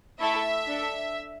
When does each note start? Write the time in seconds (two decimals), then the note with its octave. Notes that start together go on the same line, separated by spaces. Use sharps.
0.19 A3 E4 A4 E5
0.66 D4 A4